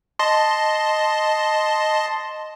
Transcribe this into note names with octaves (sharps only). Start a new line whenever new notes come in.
D#5 A5 C6